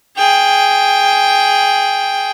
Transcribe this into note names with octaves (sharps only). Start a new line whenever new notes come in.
G#4 G5